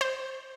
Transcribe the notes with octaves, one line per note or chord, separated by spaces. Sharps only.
C5